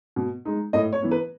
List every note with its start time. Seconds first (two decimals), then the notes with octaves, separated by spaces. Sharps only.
0.16 B2
0.45 G#3 D#4
0.73 A2 D#5
0.93 C#5
1.02 E3 B3
1.11 B4